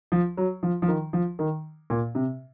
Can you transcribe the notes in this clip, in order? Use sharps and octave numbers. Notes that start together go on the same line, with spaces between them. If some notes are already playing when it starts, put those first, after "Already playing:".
F3
F#3
F3
F3
D#3
F3
D#3
A#2
C3